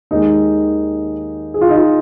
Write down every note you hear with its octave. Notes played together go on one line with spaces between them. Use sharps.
D#2 D#3 G#3 D#4
G#4
F4
D#4
F4